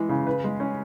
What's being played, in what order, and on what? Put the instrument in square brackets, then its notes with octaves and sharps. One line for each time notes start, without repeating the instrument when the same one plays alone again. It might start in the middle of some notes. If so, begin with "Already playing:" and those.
Already playing: [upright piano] E3 G#3
C#3
B4
G#3
C#4